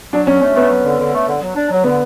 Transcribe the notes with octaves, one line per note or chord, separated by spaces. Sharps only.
F#3 D4
F#3 C#4
A3 C#4
A3 B3
F#3
D3
D3
A3
D3
F#3
D4
F#3
D3 B3